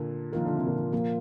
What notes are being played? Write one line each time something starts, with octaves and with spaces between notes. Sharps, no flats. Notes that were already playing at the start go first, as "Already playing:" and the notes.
Already playing: A#2 D3
D#3 F3 A#3 F4 A#4
D3
C3
A#2 D3
A#2 F3 A#3 F4 A#4